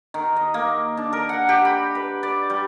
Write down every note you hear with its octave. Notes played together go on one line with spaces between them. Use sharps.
D#3
D#5
A#3
D4
A#4
F#5
G4
B5
B4
D5
G3